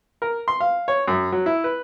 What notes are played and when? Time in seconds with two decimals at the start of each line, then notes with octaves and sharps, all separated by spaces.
0.22 A#4
0.48 C6
0.61 F5
0.88 C#5
1.08 F#2
1.32 F#3
1.46 E4
1.64 B4